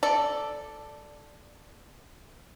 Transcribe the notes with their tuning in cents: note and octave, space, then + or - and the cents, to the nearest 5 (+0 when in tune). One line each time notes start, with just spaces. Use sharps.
A4 +0 D5 +0